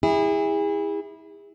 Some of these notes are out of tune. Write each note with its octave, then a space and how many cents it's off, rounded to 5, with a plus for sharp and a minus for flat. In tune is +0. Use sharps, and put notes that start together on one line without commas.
E4 -20 G#4 -35